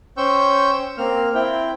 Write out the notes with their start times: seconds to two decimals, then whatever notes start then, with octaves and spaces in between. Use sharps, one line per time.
0.17 C#4 C5 G5 C#6 E6 G6
0.98 A#3 C4 F6
1.34 C4 E4 G5